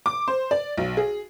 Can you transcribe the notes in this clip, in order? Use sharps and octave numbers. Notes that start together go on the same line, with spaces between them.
D6
C5
D5
B1
G#4